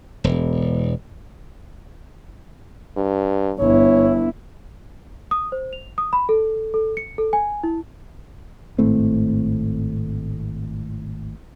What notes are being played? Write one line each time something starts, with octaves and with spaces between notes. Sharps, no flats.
E1
G2
G1 E4 C#5
D#6
C5
F7
D#6
B5
A4
A4
C#7
A4
G#5
E4
G#1 A2 A3 C4